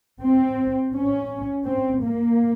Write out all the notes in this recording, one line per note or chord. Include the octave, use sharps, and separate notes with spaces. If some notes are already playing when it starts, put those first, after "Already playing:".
C4
C#4
C4
A#3